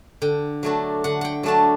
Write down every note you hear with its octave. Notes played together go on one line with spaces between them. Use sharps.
D3 G5
F#3 A3 D4
D3 F#5
F#5 G5
F#3 A3 D4 A5